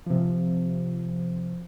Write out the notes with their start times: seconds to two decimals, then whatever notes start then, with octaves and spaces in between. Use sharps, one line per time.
0.06 C3 F3